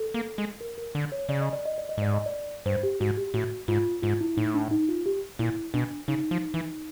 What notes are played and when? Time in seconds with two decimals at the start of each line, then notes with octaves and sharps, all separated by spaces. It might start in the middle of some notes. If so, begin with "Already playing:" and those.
Already playing: A4
0.14 A#3
0.38 G#3
0.61 A#4
0.78 A#4
0.95 D3
1.12 C#5
1.29 C#3 D5
1.41 D#5
1.53 D5
1.65 D#5
1.78 D5
1.89 D#5
1.98 G#2 D5
2.14 D#5
2.26 D5
2.66 G2 C5
2.83 G4
3.00 G#2 F#4
3.17 G4
3.34 A2 F#4
3.68 G#2 F4
4.02 G#2 F4
4.21 E4
4.37 A2 D#4
4.54 D4
4.71 D#4
4.89 F4
5.06 G4
5.39 A#2 E4
5.74 B2 D4
6.08 C#3 D#4
6.31 F3
6.54 E3